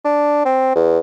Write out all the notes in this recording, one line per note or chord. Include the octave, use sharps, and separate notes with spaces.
D4
C4
E2